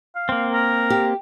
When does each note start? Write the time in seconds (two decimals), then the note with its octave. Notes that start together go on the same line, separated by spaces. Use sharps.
0.16 F5
0.29 A#3 C4
0.53 A#4
0.90 G4